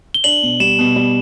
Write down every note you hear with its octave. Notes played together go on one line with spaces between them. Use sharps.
G7
D4 F#7
B2
G3 E7
B2
G3